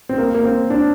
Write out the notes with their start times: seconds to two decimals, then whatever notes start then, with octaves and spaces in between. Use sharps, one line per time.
0.09 C4
0.18 A#3
0.34 A#3
0.44 C4
0.70 D4